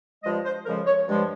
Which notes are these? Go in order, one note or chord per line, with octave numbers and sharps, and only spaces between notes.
G2 F3 G#3 D#5
C5
F2 C#3 F3 G#3 A#4
C#5
G2 F3 G#3